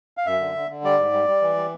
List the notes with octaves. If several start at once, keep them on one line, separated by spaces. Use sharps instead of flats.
F5
F#2 E5
D3
D3
D3
G3 D5
G#2
G3
G3
E3
G3